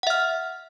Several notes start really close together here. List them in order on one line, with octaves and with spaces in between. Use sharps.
F#5 E5 F6